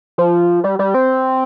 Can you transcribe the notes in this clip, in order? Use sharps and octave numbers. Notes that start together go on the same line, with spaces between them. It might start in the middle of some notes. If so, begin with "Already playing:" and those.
F3
G3
G3
C4